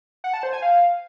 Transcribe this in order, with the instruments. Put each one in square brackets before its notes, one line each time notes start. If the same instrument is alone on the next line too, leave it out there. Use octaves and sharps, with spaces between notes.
[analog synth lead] F#5
A5
C5
G#5
F5